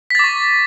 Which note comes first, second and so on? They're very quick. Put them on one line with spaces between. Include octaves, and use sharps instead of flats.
B6 A6 D6 C#6